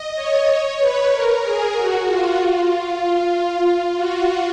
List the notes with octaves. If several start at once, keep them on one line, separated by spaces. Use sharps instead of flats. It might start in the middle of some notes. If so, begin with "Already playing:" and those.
Already playing: D#5
C#5
B4
A#4
G#4
F#4
F4
F4
F4
F4
F#4